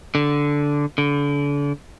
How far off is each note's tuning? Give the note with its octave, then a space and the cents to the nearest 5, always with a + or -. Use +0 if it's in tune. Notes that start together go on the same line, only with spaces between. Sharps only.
D3 -10
D3 -35